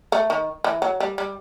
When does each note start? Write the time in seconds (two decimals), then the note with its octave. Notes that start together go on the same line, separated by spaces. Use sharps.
0.12 A3
0.30 D#3
0.64 E3
0.82 F#3
1.00 G3
1.18 G3